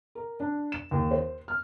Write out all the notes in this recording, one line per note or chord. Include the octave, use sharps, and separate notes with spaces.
A#4
D4
E7
D#2
C5
F6